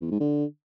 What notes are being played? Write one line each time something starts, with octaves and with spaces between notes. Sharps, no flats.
E2
G#2
D3